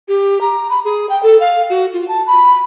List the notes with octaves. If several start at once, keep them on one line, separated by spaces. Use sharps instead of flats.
G4
A#5
B5
G#4
G5
A4
F5
F#4
F4
A5
B5